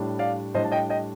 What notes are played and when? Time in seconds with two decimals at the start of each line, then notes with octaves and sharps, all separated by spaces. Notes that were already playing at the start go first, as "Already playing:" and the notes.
Already playing: A2 G3 D4
0.19 D5 F5
0.54 A2 G3 D4 C5 D#5
0.64 A5
0.72 D#5 G5
0.90 D#5 G5